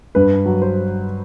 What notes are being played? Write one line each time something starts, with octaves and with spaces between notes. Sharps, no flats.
G2 B4
F#3
C5